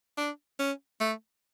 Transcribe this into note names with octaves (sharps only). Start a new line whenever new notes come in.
D4
C#4
A3